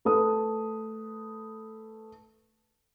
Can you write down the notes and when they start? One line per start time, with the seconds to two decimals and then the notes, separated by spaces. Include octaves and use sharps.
0.05 A3 B4 A5 D#6